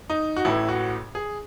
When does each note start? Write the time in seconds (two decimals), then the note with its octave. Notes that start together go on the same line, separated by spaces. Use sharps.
0.10 D#4
0.37 F#4
0.45 A1 A2 E3 E4
0.69 F#4
1.15 G#4